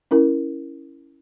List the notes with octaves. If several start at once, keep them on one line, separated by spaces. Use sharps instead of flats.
C#4 E4 A#4